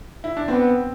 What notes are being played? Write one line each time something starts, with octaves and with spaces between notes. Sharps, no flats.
E4
D4
B3 C4